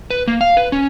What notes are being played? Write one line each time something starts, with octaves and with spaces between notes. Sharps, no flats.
B4
A#3
F5
B4
C#4